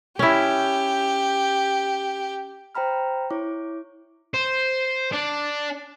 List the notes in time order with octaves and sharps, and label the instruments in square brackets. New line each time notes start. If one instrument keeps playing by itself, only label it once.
[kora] C#4 E4 [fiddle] G4
[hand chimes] C5 G5 A#5 B5 F6
E4 C#5 D6
[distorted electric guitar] C5
D4